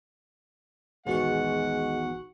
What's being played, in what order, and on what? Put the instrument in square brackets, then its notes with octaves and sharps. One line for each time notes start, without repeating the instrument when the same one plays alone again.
[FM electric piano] A#1 F#4 C#6 [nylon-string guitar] E2 D#3 [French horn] G#3 [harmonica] F#5